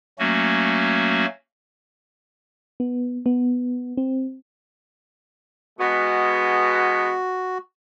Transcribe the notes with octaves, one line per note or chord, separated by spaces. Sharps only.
F#3 A3 A#3 C#4 F#4
B3
B3
C4
B2 G#3 B3 F#4